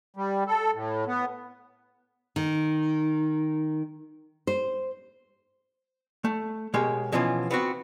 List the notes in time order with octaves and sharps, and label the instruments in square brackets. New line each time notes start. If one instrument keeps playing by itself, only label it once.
[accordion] G3
A4
A2
B3
[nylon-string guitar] D#3
C5
[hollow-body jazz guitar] A3
B2 G#3 G4 A#4 C#5
B2 E3 F3 C#4 F4
B3 C4 F#4